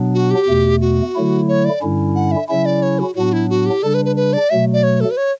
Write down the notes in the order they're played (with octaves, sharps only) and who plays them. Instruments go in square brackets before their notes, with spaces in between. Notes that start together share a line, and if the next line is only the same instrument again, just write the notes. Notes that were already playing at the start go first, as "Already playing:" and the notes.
Already playing: [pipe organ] B2 F#3 B3 D4
[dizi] F#4
G4
[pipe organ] E2 B2 A3
[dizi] F#4
[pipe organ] D3 F#3 A3 E4
[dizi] C#5
D5
[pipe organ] G2 D3 G3 C#4 E4
[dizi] F#5
E5
[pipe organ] C#3 F#3 C#4 E4 [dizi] E5
[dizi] D5
C#5
F#4
[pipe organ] A2 F#3 B3 D4 [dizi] F#4
[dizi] E4
F#4
G4
[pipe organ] C#3 G3 D4 [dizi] A4
[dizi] B4
B4
B4
D5
[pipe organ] B2 F#3 A3 [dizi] E5
[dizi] D5
C#5
A4
B4
C#5